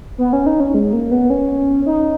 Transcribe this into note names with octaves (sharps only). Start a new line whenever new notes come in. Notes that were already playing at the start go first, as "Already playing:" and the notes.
B3
C#4
D#4
C#4
G#3
A#3
B3
C#4
D#4